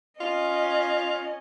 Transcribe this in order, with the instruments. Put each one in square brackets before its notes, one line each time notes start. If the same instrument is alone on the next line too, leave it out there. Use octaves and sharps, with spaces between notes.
[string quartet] C#4 D#5 [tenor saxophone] F4